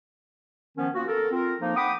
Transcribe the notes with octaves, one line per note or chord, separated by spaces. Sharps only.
D#3 F3 B3 C#4
A#3 B3 F4 F#4
A4 A#4
C4 F4 A#4
F3 A#3 D#4
F#5 G5 B5 D6 D#6